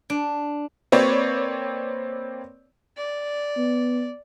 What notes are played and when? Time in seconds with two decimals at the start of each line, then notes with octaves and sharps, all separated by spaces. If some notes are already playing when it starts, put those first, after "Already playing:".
0.10 D4
0.92 A#3 C4 B4 C#5 D5
2.97 D5
3.56 B3